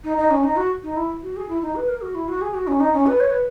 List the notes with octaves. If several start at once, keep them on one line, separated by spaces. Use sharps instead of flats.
D#4
D#4
C#4
D#4
F#4
D#4
E4
F#4
G#4
E4
D#4
B4
A#4
F#4
E4
F#4
G#4
F#4
C#4
D#4
C#4
B4
C#5
B4